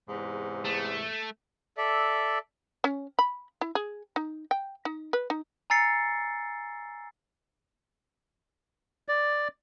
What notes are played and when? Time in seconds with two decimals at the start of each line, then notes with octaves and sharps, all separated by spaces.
0.09 E2 G#2 C3
0.65 A3
1.77 A4 D5 E5
2.84 C#4
3.19 B5
3.61 E4
3.75 G#4
4.16 D#4
4.51 G5
4.85 D#4
5.13 B4
5.30 D#4
5.70 G#5 A#5 E6 A6 C7 C#7
9.08 D5